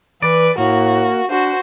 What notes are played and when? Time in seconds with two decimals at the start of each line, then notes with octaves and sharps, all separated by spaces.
0.22 E3 B4 D5
0.58 A2 A#3 F#4
1.30 D4 F#4 C5